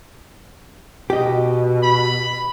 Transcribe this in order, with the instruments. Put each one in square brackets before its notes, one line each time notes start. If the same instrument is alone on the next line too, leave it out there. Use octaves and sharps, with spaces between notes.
[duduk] B2 [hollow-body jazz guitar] G4 D#5
[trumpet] B5